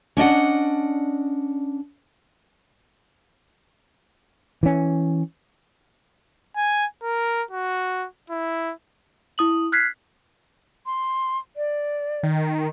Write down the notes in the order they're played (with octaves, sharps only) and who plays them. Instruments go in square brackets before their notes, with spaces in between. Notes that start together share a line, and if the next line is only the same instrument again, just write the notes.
[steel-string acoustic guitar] C#4 D4 D#5 F#5
[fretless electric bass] E3 C#4
[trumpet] G#5
A#4
F#4
E4
[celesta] E4 D#6 F#7
F6 F#6 G#6 B6 C7
[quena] C6
D5
[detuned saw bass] D#3